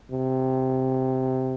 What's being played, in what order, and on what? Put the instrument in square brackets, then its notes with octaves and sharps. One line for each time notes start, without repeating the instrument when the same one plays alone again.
[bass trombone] C3